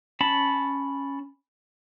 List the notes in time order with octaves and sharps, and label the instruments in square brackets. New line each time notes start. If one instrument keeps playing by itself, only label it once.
[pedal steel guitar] C#4 A5 B5